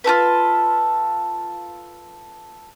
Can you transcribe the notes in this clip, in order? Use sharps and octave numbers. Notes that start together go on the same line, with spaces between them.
F4 F#4 A4 B4